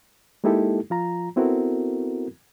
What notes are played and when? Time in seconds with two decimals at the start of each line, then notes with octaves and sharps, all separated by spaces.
0.44 G#3 A#3 D#4 E4 G4 A4
0.90 F3 F4 A#5
1.36 B3 C4 E4 F#4 A4 A#4